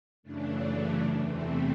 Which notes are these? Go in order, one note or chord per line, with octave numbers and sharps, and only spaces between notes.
F#2 C#3 E3 A3 D4
E2 C3 E3 A3 C4